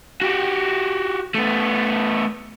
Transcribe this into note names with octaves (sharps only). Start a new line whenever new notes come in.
F#4 G4
A3 B3